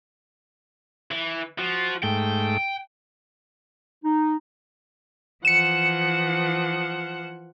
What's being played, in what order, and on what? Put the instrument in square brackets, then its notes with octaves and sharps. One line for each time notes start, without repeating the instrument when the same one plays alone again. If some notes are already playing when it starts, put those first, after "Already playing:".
[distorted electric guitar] E3
[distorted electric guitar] F3 [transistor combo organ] F#4
[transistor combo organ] G#2 A3 [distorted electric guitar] G5
[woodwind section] D#4
[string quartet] E3 F3 F#5 [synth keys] C#7 E7